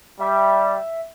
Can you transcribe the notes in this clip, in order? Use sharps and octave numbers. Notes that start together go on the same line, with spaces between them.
G3 E5